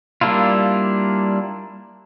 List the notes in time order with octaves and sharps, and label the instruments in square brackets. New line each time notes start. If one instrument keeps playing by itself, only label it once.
[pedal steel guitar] G3 A#3 D4 E4 F4